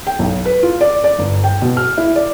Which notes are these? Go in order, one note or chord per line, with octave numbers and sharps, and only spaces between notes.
G5
B1
B4
F4
D5
D5
G1
G5
B2
F6
E4
D5